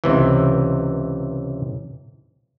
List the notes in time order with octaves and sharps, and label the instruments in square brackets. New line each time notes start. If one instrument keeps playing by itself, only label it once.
[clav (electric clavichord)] C#2 C3 E3